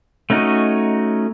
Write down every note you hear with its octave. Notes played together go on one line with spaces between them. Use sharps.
A3 C#4 D#4 F#4 D#5